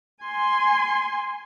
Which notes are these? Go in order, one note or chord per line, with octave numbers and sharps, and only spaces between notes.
G#5 C6